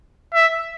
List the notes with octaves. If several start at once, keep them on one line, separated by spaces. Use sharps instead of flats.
E5